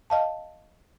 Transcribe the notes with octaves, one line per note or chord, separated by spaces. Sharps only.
D#5 F5 A5